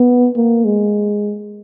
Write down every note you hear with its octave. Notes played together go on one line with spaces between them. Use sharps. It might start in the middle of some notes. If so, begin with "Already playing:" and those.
Already playing: B3
A#3
G#3